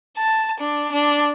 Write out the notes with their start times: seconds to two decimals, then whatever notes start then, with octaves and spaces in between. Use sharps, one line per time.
0.17 A5
0.60 D4
0.92 D4